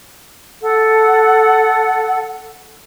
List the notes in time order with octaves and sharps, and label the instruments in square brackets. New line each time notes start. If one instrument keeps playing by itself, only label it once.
[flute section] A4 F#5